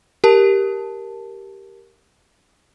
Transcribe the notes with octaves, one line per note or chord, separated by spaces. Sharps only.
G4 A#4 A5